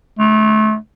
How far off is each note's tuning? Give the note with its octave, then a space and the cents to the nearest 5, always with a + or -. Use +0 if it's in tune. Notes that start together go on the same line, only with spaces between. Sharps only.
A3 -30